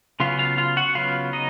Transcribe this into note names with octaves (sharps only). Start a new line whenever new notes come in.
C#3 F#3 B3 F4 F5
F4 F5
F4 F5
F#4 F#5
C#3 F#3 B3 F4 F5
D#4 D#5